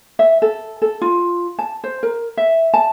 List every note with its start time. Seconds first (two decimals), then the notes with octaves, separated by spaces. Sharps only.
0.19 E5
0.42 A4
0.82 A4
1.01 F4
1.59 A5
1.84 C5
2.03 A#4
2.37 E5
2.74 A5